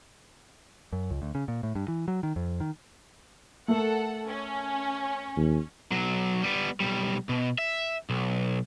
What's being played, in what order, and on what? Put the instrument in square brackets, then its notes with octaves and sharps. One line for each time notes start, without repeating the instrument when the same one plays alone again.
[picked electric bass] F#2
C#2
D2
C#3
A#2
A2
G2
E3
F#3
D#3
F2
D#3
[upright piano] A3 A#4 [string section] A4 F#5
[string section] C#4
[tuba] D#2
[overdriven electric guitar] B1 F#3
G3 B3
B1 G3
B2
E5
B1